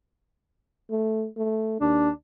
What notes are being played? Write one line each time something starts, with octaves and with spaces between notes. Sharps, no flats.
A3
A3
D#2 D4